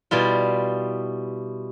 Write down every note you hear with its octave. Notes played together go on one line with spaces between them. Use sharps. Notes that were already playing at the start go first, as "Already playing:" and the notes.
B2 G3 E4 F4